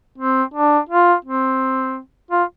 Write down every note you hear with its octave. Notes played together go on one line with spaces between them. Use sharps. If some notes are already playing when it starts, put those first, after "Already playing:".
C4
D4
F4
C4
F4